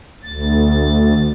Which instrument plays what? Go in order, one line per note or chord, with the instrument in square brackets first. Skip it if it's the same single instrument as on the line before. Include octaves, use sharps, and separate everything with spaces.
[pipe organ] D2 A6